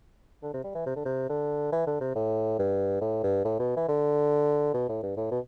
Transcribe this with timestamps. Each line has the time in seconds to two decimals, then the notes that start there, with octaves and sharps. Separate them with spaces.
0.43 D3
0.54 C3
0.64 G3
0.75 E3
0.86 C3
0.96 D3
1.05 C3
1.29 D3
1.72 E3
1.87 D3
2.01 C3
2.15 A2
2.59 G2
3.01 A2
3.23 G2
3.45 A2
3.59 B2
3.76 E3
3.88 D3
4.74 B2
4.89 A2
5.03 G2
5.17 A2
5.31 B2